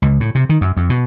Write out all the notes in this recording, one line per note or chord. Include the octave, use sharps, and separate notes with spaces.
C#2
A2
C3
D#3
F#2
F2
B2